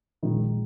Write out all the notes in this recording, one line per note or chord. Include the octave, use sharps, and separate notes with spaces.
A#1 A#2 D#3 G#3 D#4